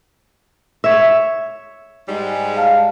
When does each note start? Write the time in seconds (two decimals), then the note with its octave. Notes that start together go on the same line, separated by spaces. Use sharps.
0.84 C#5 E5
2.08 G#2 G3 G#3
2.57 F5 A5 F6